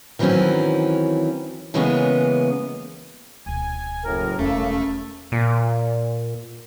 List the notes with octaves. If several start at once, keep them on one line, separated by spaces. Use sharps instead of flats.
D#3 E3 F#3 C4 C#4 E4
C#3 E3 G#3 A#3 B3 C#4
D1 B2 G#5
F#1 A2 A#4
E1 C#3 A3 A#3 C#4
A#2